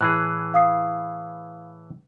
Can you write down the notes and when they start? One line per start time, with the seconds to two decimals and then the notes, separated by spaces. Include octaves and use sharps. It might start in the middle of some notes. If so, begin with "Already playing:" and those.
0.01 A2 E3 G#4 F#6
0.54 F5 D#6 C7